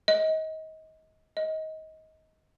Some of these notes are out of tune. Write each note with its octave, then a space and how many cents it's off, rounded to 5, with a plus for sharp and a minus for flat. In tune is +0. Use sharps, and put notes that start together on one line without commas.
D#5 +25
D#5 +20